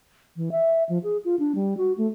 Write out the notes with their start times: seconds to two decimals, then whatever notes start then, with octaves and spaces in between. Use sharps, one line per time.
0.36 E3
0.52 E5
0.89 F3
1.04 G#4
1.25 F4
1.39 D4
1.55 G3
1.77 F#4
1.98 A3